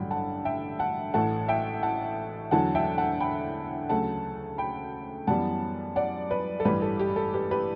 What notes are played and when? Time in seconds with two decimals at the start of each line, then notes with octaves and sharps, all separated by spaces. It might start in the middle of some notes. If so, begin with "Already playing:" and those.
Already playing: A1 G2 D3 F#3 G5 B5
0.11 F#5 A5
0.45 E5 G5
0.79 F#5 A5
1.14 A1 A2 E3 A3 F#5 A5
1.48 E5 G5
1.83 F#5 A5
2.51 E2 D3 F#3 F#5 A5
2.75 E5 G5
2.98 F#5 A5
3.21 G5 B5
3.89 D2 C#3 F#3 A3 F#5 A5
4.58 G5 B5
5.27 F#2 E3 G3 B3 F#5 A5
5.96 D5 F#5
6.30 B4 D5
6.60 A4
6.65 A1 G2 E3 G3 G4 B4
6.82 A4
6.99 G4
7.16 A4
7.34 G4 B4
7.51 G4 B4